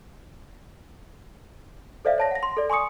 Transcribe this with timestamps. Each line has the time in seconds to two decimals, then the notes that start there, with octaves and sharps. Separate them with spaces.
2.05 A4 C5 D5 E5 F5
2.18 C#5 A5 A#6
2.31 F#5 A#6
2.43 C6
2.57 A4 D5
2.70 G#5 C6 C#6 D#6 C#7